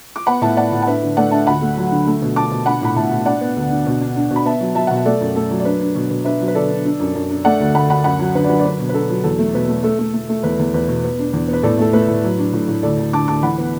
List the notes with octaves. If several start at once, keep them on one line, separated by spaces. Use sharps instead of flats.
D6
B3 F#5 B5
A2 E5 A5
B3 D5 F#5
A2
F#5
D4 B4 E5
D3
A3 D5 F#5
D4 E5 A5
D2 F#5 B5
A3
F#3
D3
A3
B2
D4 A5 D6
B2
D4 F#5 B5
A2 B5
A2 E5 A5
A2
D4 D5 F#5
B3
D2
D3
B2
D4
D4
B2
B5
B3 E5 A5
F#3
F#3 E5 A5
B2 F#5
E5
A3 A4 D5
F#2
A3 A4
F#3
D5
D4 B4
D4
B2
B2
D4 B4 E5
F#3
B4
D3 A4 D5
D4
D4
F#2
F#2
D4
A3 D5 F#5
D2
D2 F#5 B5
D2 F#5 B5
F#2 F#5 B5
F#3
D3 B4
D5
F#3 B4
D5
D4 B4
B2
B4
D4 A4
F#3
E2 A4
A3
B2 B4
A3
A3 A4
A3
A3
A3
E2 B4
E2
E2 B4
B2
B3
D4
E2
B3
B4
A2 A4 D5
A3 A4
A3 B4
A2
F#3
D4
A2
A2
D2 A4 D5
D2
D3 A5 D6
D2 A5 D6
E3 F#5 B5
B3